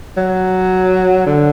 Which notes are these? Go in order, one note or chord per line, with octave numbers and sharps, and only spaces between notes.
F#3
D3